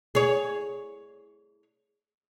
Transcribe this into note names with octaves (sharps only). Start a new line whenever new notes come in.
G#4 C#5